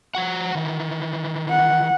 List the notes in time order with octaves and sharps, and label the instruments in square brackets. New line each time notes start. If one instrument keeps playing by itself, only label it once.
[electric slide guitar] F3 F#4 F#5
D#3 E3
[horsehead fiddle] F#5